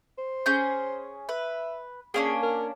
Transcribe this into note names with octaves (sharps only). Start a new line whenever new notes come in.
C5
C#4 G#4 G6
B4 E5
A#3 C#4 D4 G#4
A#4